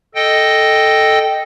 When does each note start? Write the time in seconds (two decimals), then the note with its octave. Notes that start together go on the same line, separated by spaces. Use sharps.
0.15 A4 D#5 G5